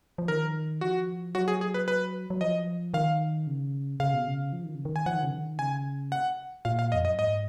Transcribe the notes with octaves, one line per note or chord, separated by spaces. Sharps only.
F3
D#3 A#4
F3 F#4
F#3 F#4
G#4
G#4
B4
B4
F#3
F3 D#5
D#3 F5
C#3
C#3 F5
B2
C#3
F3
D#3
C#3
D#3
G#5
F3 F#5
D#3
C#3
D#3
C#3 G#5
F#5
A#2 F5
F5
F2 D#5
F#2 D#5
G#2 D#5